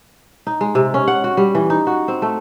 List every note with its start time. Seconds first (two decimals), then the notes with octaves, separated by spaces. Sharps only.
0.47 D#4
0.61 G#3
0.75 C3
0.94 C#4
1.08 F#5
1.24 F#4
1.37 G3
1.55 E3
1.70 D#4
1.87 F#4
2.08 C4
2.22 A3